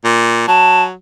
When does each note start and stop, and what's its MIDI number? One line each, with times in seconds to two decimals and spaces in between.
0.05 0.44 46
0.48 0.93 54
0.48 0.83 81